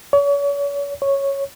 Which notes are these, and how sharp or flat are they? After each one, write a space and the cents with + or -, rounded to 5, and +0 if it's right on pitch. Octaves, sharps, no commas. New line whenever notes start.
C#5 +40
C#5 -5